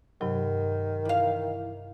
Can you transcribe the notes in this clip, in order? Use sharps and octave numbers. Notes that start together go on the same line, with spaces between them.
G2 C3 D#3 F#3
E3 F5